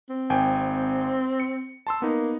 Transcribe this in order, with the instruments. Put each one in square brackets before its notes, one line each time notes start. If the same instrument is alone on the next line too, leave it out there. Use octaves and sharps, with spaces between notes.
[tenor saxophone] C4
[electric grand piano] G#1 G5 G#5
C#7
A5 C6 E6
[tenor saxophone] A#3 [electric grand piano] B3 D#4